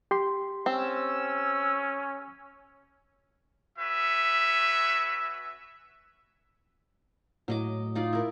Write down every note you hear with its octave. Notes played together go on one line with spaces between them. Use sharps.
G4 C6
C4 C#4 E6
C#4 F#4 B4 E5
A2 F#3 D#5 D6
D#4 F4 D5
E4 A#4